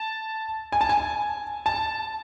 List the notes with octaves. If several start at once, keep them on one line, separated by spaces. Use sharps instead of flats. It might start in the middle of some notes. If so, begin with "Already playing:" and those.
Already playing: A5
G#5
A5
G#5
A5